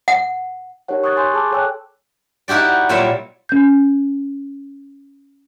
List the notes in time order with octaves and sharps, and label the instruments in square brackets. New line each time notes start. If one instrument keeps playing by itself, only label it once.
[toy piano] F#5
[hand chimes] D#4 G4 A#4 C#5 F#5
C#6 D#6 F#6 G#6 A6
G#5 C6 C#6 F#6 G6
G#4 A5 D6 E6
A4 C#5 G5 G#5 E6 F#6
[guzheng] D#4 E4 F#4 G4 D5
A#2 F#3 G3 C#5 E5
[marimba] C#4 G6